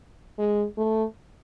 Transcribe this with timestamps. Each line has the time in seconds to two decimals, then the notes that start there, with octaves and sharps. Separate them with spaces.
0.38 G#3
0.77 A3